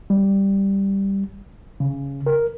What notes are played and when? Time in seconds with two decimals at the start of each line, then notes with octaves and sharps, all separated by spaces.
0.10 G3
1.80 C#3
2.26 A#4